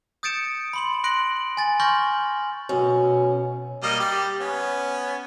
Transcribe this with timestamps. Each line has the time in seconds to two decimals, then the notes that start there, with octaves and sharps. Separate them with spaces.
0.23 D#6 G6 A6 C#7 D7 E7
0.73 B5 C6 F#7
1.04 C6 F#6 A#6 D7 F#7
1.57 G#5 A6
1.80 C6 C#6 F6 G6 A#6 F#7
2.69 F#2 B2 C#4
3.83 G3 A#3 D#5
4.00 G3 G4
4.40 B3 C#4